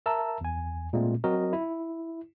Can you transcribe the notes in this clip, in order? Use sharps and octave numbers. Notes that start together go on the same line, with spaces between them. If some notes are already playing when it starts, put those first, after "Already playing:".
A#4 E5 A5 A#5 E6
E2 G#5
A#2 G#3 A3 C4
F#3 C4 F#4 A#4 D#5
E4